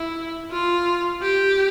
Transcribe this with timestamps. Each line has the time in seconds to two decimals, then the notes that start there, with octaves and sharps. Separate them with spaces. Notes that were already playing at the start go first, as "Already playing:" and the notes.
Already playing: E4
0.51 F4
1.21 G4